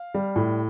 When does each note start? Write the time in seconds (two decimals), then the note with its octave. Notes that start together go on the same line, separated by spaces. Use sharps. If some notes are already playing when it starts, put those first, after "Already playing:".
Already playing: F5
0.14 G3
0.36 A2